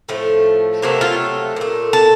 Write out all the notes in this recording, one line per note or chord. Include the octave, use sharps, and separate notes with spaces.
A2 F3 A3
C3 F#3 A3 A#3
F4
A#2 A3
A4